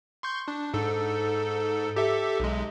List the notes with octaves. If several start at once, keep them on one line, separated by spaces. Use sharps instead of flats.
C6 C#6 G6
D4
G#2 A4
G4 A4 E5
B1 G#3